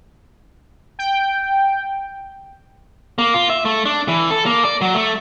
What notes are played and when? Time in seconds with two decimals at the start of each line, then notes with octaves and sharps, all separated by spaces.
0.99 G5
3.18 A#3
3.34 F4
3.50 E5
3.65 A3
3.85 D4
4.08 E3
4.31 A4
4.46 A#3
4.65 D5
4.81 F#3
4.95 A3